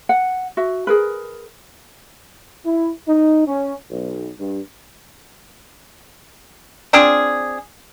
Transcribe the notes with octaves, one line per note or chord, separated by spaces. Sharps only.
F#5
F#4 E5
G#4 A#4 B4
E4
D#4
C#4
B1
G2
C4 D4 F4 G#4